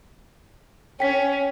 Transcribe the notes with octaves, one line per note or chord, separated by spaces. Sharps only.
C#4 G5 B6